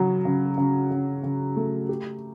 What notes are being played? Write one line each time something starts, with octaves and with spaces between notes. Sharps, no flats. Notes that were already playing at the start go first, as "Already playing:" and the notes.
Already playing: C#3 F#3
C#3
C#3
C#3
C#3
A3
G4